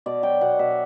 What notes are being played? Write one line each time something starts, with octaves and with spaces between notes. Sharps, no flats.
B2 D5
F#3 G5
B2 F#5
B2 E5